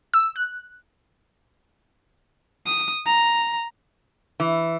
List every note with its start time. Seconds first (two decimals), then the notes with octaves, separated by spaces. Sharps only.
0.14 E6
0.36 F#6
2.66 D#6
3.06 A#5
4.40 E3